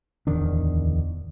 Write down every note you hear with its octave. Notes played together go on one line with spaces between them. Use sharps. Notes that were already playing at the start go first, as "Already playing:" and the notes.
D1 E2 D#3 D4